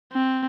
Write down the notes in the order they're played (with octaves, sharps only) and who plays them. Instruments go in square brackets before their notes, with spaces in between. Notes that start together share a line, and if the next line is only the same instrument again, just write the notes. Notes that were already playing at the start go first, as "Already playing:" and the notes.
[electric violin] C4